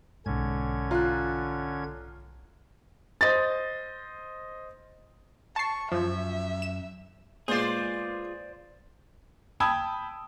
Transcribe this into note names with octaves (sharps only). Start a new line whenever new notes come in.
B1 G#2 D3 C#4 G#6
F4 A#5 F#6
C5 D#5 A6
A5 C#6 C7
F#2 F3 E5
E7
A#2 G#3 B3 F4 G#4 C5 D5
G5 A5 B5 D#6 E6 G#6